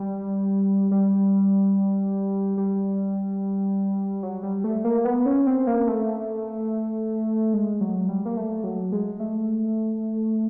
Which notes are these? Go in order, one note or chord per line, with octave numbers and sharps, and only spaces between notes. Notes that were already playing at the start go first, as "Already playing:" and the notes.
Already playing: G3
G3
G3
F#3
G3
A3
A#3
B3
C#4
C4
A#3
A3
G#3
F#3
G3
A#3
A3
F#3
G#3
A3